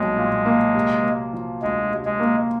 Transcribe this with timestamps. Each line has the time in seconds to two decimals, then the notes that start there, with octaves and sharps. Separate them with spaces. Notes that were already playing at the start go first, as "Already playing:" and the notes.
Already playing: B1 A#2 G3 G#3 A#3
0.17 A#2
0.46 A#3
0.75 C3
1.04 A#3
1.33 F3
1.62 D2 G#3
1.91 C3
2.05 G#3
2.20 A#3